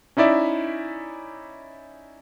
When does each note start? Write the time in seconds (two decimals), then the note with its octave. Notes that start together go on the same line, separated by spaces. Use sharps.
0.17 C#4 D#4 E4 D5 E5